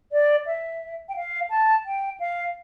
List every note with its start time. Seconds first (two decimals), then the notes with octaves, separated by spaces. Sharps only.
0.11 D5
0.45 E5
1.08 G5
1.16 F5
1.49 A5
1.85 G5
2.19 F5